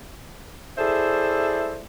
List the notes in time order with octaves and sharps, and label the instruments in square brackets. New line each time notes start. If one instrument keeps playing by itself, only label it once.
[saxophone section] E4 G#4 A4 C5 D5 E5